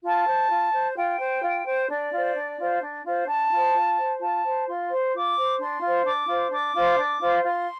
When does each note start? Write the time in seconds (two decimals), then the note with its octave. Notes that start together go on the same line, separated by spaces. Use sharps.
0.04 F4 A5
0.28 C5
0.50 F4
0.73 C5
0.96 F4 G5
1.19 C5
1.43 F4
1.65 C5
1.89 D4 D5
2.12 F4 C5
2.35 D4
2.59 F4 C5
2.82 D4
3.05 F4 C5
3.27 D4 A5
3.51 F4 C5
3.73 F4
3.97 C5
4.19 F4 A5
4.43 C5
4.66 F4 C6
4.89 C5
5.13 F4 D6
5.36 C5
5.59 D4 C6
5.81 F4 C5
6.04 D4 D6
6.28 F4 C5
6.51 D4 D6
6.75 F4 C5
6.97 D4
7.20 F4 C5
7.44 F4 C6